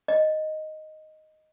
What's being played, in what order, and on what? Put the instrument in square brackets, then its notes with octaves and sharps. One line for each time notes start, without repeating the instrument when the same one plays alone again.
[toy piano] D#5